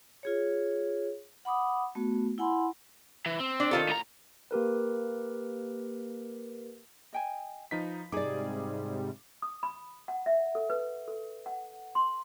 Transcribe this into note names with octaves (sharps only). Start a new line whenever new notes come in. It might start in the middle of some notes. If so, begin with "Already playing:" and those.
F4 G#4 C#5
F#5 B5 D6 D#6
A3 B3 F#4
E4 F#5 G#5 B5 C6
E3
C4
D4
D#3 F4 A4
A2 A#5
A#3 G4 A#4 B4
D#5 G5 G#5
F3 D#4 F4 B4 B6
G#2 C3 G3 D#4 G#4 D5 D6
D#6
B5
F#5
E5
A4
B4
A4
F#5
C6